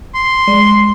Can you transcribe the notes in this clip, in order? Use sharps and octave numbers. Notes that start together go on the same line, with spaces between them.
C6
G#3 D5